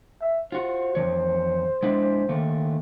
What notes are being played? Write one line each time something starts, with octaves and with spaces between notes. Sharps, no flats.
E5
F4 F#4 C5
F2 E3 C#5
G#3 D4 E4
D#3 A3 A#3